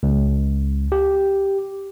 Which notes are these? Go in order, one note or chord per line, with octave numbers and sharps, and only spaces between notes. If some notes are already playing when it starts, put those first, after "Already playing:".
C#2
G4